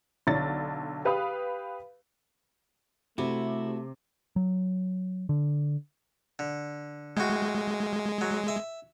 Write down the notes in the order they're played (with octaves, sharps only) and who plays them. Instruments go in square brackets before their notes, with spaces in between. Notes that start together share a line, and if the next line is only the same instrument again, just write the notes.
[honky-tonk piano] B1 D3 C#5 A6
G4 B4 F5 B5 D#6
[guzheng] C3 [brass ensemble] A3 [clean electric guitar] E4 [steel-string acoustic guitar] F#4
[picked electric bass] F#3
D3
[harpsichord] D3
[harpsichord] A2 F#4 [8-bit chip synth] G#3
[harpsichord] F#3
E5